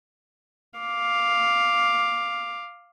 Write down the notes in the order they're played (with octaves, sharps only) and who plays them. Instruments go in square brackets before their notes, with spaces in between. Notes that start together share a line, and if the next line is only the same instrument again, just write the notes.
[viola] F5 D6